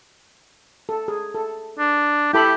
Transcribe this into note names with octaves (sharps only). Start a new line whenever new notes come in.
A4
G#4
A4
D4
E4 G4 A4 B5